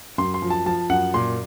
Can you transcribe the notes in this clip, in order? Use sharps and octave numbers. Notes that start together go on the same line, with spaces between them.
F#2 C6
C6
F3
A5
F3 A5
F#2 F#5
A#2 C6